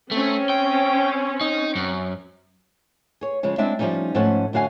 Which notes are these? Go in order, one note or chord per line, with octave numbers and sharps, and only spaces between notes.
A3 C4 C#4
G5
D#4
F#2
G#4 C#5
C#3 F3 G#3 C#4
G#3 C4 D4 E4 D5 E5
F3 G3 A3 C#4 D#4
G#2 F3 A3 C#4 F#5
F#2 D3 F#4 F5 G#5